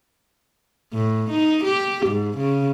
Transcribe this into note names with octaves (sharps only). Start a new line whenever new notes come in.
A2
D#4
G4
G#2
C#3